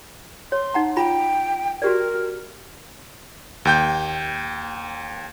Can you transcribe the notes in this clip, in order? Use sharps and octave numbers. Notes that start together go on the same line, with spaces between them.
C#5 C6
D#4 F#5 A#5
F4 G5 A#5 B5
F#4 G4 A#4 D5
D#2 G5 G6